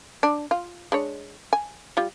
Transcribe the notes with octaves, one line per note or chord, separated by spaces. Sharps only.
D4
F4
G#3 D4 C#5
G#5
G3 F4